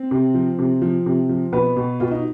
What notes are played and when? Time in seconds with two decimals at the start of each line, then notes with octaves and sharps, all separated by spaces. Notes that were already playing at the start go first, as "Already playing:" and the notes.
Already playing: C4
0.11 C3
0.34 F3
0.59 C3
0.82 F3
1.06 C3
1.29 F3
1.52 B2 B3 B4
1.77 B2
2.00 B2 F4
2.11 D#4